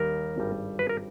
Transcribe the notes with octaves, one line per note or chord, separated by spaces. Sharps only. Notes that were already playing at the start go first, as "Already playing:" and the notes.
Already playing: D#2 D#3 G3 A#4
G#1 G2 G3
B4
A#4